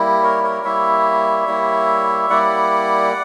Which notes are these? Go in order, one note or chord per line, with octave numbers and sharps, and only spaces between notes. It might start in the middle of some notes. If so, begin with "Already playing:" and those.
Already playing: G3 A#3 E4
A#4 C#5
A#4 C#5
G3 A#3 E4 C#5 E5
G3 A#3 E4
G3 A#3 E4 D5 F#5